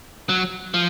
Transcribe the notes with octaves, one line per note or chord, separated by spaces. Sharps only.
F#3
F3